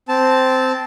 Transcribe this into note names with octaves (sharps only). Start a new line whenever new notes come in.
C4 A5